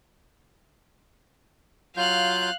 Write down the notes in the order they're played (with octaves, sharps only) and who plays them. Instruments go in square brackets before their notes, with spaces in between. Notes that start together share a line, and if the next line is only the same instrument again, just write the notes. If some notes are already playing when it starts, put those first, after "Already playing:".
[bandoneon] F#3 F4 G6 [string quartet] F5 F#6